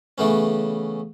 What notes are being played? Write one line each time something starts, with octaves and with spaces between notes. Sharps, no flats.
C#3 E3 A3 B3 C#4